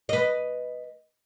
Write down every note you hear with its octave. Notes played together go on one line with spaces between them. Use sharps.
B4 D#5